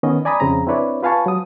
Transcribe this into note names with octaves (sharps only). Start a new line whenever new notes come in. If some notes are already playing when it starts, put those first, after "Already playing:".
D#3 B3 C#4 D#5
D5 G#5 A#5 B5 D#6
F2 C#3 C4 A#5
C4 D4 E4 B4 C#5 D5
F4 B4 F5 G#5 A5 C#6
F#3 D#6